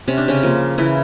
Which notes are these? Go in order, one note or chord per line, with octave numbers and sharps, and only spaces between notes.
C3 C#4
D4
C#3 C#4
F3 A#3
C#3 E3 E4